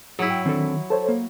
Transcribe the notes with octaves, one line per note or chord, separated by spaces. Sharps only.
G#2 F#3 E4 G#4
G5
D#3 C4 D4 A4
A4 C5 C#5 A5
A#3